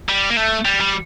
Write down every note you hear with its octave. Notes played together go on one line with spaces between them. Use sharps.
G3
A#3
A3
G3
G3